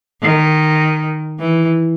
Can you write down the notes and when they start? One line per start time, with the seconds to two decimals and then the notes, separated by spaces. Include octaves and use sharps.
0.22 D#3
1.40 E3